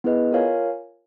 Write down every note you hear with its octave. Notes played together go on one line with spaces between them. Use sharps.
B3 E4 G#4 B4 D#5
F4 A#4 C#5 F5 G#5